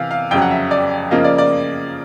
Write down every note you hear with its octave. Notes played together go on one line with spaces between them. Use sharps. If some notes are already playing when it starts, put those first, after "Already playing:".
Already playing: C3 E3 F5
F5
F2 C#3 F#3 G5
F#5
E5
D5
C#3 F3 A#3 D#5
D5
D5